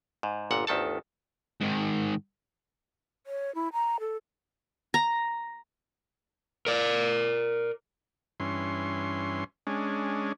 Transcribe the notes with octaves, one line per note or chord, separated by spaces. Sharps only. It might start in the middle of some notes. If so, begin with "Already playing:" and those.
G#2
G1 A#2 F#5
G1 D2 D#3 A4 A5
G#2 D#3
C#5
E4
A#5
A4
A#5
A#4 D5
G2 E3 C#4 C6
G#3 C#4 D4